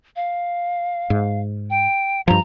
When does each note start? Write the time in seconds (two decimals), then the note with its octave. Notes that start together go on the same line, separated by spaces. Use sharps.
0.16 F5
1.10 G#2
1.70 G5
2.28 G2 F3 A#5